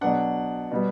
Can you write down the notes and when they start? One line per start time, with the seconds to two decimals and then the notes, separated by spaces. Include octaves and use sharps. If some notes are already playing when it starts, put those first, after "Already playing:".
0.01 B2 F#3 B3 D4 F#5
0.71 B2 G3 B3